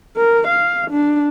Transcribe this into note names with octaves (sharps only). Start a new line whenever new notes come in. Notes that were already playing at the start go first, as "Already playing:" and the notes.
A#4
F5
D4